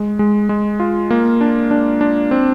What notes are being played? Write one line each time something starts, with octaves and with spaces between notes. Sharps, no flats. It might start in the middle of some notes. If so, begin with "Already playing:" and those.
Already playing: G#3
G#3
G#3
F4
A#3
D4
D4
D4
C4